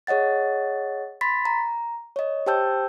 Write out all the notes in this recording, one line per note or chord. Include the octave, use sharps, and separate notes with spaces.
G#4 C#5 D#5 F#5 A6
B5 C6 A6 B6
A#5
C#5 D#5
G4 C5 G5 A5 E6 G6